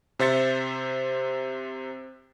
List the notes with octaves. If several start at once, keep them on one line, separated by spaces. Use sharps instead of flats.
C3 C5 E5 A6 C#7